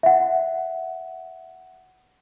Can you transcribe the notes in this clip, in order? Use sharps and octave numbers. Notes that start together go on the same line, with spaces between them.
E5 F#5